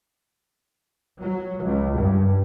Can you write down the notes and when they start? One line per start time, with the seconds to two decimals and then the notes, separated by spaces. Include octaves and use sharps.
1.20 F#3
1.64 C#2
1.97 G2